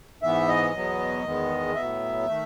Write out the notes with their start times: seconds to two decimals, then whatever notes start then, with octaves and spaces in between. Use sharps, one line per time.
0.23 G#2 E3 B3 E5
0.48 D#5
0.74 E2 B2 F#3 B3
1.24 E2 D#3 G#3 B3
1.75 A2 F#3 B3 E5
2.26 D#3 A3